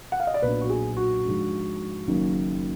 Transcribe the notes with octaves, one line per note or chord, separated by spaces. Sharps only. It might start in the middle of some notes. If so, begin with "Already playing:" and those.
F#5
F5
D#5
D5
B1 A#2 F#3 B3 D4 B4
F#4
G#4
F#4
G#2 F3 G#3 D4
F#1 F#2 D#3 F#3 A#3